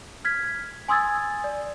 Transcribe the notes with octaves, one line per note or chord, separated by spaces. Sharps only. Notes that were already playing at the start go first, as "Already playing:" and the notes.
F6 G#6 B6
G#5 C6 D#6 E6 G#6 A6
D5